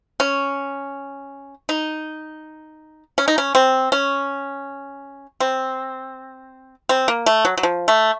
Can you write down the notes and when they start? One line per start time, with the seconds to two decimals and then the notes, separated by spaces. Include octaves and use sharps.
0.20 C#4
1.69 D#4
3.18 C#4
3.28 D#4
3.38 C#4
3.55 C4
3.92 C#4
5.40 C4
6.89 C4
7.08 A#3
7.26 A3
7.45 F#3
7.57 F#3
7.63 F3
7.88 A3